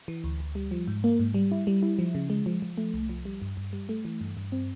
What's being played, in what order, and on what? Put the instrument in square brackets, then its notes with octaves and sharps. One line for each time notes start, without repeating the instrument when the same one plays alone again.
[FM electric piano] E3
D2
D2
G3
F3
G#2
A#3
G#2
G3
E4
G3
E4
F3
C#3
G#3
F3
F3
A3
C2
F3
G3
G2
G2
G3
A3
E3
G2
G2
C4